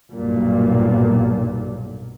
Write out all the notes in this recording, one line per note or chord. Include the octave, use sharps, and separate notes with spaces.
B1 G2 A#2